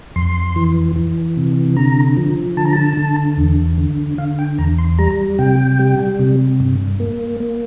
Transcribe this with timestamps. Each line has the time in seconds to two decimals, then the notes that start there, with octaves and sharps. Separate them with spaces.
0.16 F2 C6
0.56 E3
0.96 E3
1.37 C3
1.77 D3 A#5
2.17 F3
2.57 D3 A5
2.65 A#5
2.73 A5
2.97 D3
3.37 E2
3.78 D3
4.18 D3 F5
4.39 G5
4.58 E2 A#5
4.78 C6
4.98 G3 A#5
5.39 C3 G5
5.79 G3
6.19 C3
6.60 G2
7.00 A#3
7.40 A#3